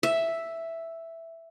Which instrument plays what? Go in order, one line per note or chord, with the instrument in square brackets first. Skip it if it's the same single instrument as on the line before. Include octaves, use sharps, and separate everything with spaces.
[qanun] E5